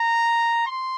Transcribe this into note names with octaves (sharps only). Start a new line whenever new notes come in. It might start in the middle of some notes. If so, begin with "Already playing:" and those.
Already playing: A#5
C6